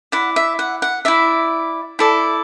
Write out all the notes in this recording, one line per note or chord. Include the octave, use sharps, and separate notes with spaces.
E4 D5 F#5
E5
F#5
F#5
E4 D5 E5
E4 A4 D5